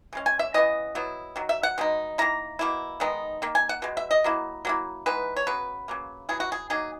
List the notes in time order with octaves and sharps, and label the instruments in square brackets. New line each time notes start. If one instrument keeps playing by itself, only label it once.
[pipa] C#3 G#3 C#4
G#5
E5
C#3 E3 B3 D#5
F#3 B3 E4
D#3 F#3
E5
F#5
B2 G#3 D#4
D#3 A#3 E4 A#5
B2 A#3 E4
D#3 G#3 B3 D#4
D#3 A#3
G#5
F#5
B2 G#3
E5
D#5
F#3 A#3 E4
F#3 A#3 E4
E3 G#3 B3 D#4 B4
C#5
C#3 F#3 B3 B4
C#3 F#3 A#3
F#3 B3 E4 G#4
F#4
G#4
F#3 A#3 D#4 G#4